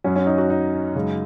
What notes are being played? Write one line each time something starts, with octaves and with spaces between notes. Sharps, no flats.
F#2 F#3 C#4
C#4
D#4
F#4
D#4
F#2 C#3 G#3